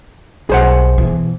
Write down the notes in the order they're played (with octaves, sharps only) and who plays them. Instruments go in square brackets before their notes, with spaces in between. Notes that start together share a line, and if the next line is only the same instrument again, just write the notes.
[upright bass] B1 [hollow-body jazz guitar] G#4 C5 F#5
[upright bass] B2 E3